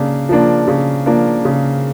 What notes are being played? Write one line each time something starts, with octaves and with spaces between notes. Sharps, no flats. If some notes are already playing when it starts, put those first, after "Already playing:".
Already playing: C#3 A#3 D4
F3 A#3 D4
C#3
F3 A#3 D4
C#3